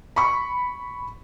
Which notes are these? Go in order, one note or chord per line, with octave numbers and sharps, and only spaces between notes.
B5 C#6